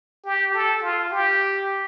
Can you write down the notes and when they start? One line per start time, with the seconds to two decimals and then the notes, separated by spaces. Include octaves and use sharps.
0.25 G4
0.55 A4
0.82 F4
1.11 G4